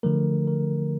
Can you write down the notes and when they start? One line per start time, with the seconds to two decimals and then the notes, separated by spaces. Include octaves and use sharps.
0.03 D3 F3 A3 A#4
0.47 A#4